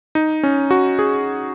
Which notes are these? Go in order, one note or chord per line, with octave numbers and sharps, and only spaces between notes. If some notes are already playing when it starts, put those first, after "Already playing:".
D#4
C#4
F#4
G#4